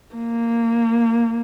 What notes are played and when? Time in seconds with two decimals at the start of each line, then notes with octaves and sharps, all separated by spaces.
0.15 A#3